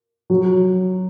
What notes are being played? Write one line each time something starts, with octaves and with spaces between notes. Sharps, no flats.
F#3